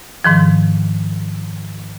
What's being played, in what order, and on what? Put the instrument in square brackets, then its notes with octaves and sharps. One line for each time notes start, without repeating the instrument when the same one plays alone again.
[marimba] G#2 D#3 F3